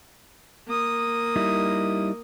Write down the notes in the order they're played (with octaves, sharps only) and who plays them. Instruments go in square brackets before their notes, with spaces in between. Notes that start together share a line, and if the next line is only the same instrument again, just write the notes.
[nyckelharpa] A#3 D#6
[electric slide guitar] G3 D#4 E4